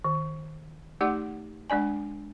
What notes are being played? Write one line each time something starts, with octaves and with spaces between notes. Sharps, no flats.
D#3
A3 D#4 G4 D5 F#5 D6
G#3 D4 D5 G#5